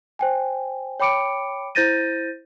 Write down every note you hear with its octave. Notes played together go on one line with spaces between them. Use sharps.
C5 G5 G#5
C#5 G5 B5 D6 C#7 D7
E4 C5 G6 A6 A#6 D#7